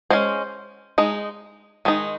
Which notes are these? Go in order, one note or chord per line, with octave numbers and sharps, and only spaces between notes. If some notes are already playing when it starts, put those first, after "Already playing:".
G#3 C#4 C5
G#3 D#4
D#3 G#3 D#4